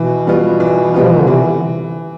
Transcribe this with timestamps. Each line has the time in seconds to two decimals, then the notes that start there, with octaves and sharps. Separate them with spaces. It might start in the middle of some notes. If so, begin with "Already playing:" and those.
Already playing: B2 E3
0.27 G3 B3 F4
0.60 E3
0.94 G3 B3 F4
1.02 F3
1.10 E3
1.19 D3
1.27 C3 E3